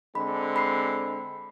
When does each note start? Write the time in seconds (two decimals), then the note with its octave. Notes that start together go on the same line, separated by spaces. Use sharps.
0.15 D3 G#3 C4 B5
0.56 B5 C7